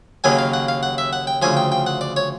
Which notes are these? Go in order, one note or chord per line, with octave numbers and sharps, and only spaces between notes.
D#2 C#3 F#3 A#3 G#5
F5
F#5
F5
F#5
E5
F#5
G5
D2 C#3 F3 G#5
G5
G5
F#5
D5
C#5